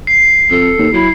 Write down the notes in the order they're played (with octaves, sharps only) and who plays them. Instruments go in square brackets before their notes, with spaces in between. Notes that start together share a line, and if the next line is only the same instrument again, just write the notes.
[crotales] C7
[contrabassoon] F2 [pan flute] A4
[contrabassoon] D#2
[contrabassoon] F#3 [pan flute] E4